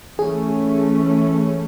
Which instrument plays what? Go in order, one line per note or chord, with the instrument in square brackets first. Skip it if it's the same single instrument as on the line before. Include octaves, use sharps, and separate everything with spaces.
[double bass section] E3 A3 C#4 [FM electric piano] G#4